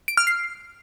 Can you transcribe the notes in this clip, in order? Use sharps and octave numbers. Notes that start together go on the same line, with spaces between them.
D7
F6
C7